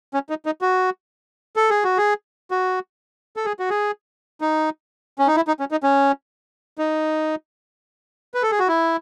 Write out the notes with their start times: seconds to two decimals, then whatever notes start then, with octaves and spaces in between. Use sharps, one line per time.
0.14 C#4
0.30 D#4
0.46 D#4
0.61 F#4
1.56 A4
1.70 G#4
1.84 F#4
1.98 G#4
2.51 F#4
3.36 A4
3.45 G#4
3.59 F#4
3.70 G#4
4.41 D#4
5.19 C#4
5.27 D#4
5.36 E4
5.48 D#4
5.60 C#4
5.71 D#4
5.83 C#4
6.78 D#4
8.34 B4
8.43 A4
8.51 G#4
8.60 F#4
8.68 E4